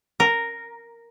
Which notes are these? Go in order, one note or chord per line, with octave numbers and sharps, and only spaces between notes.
A#4